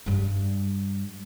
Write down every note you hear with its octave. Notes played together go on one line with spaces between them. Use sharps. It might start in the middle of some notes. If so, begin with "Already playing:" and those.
G2 G3